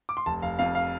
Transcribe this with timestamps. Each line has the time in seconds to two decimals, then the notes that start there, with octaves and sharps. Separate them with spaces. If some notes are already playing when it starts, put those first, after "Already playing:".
0.09 D6
0.17 C6
0.26 F1 A5
0.42 F1 F5
0.59 F2 F5
0.75 F5